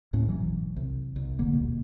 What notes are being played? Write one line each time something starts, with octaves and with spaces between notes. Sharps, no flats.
D#2 A2 C#4
G#1 B2 E3 F#3
C2
C2
F1 E2 D3 A#3
E1 D#2 B2 A#3